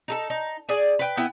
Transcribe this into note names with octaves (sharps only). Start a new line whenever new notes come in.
D#4 G#4 A4
D#4
G#4 D5 G#5
B4 G5
B3 E4 G5 G#5